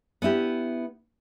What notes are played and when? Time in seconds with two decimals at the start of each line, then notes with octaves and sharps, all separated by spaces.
0.22 B3 D4 E4 G4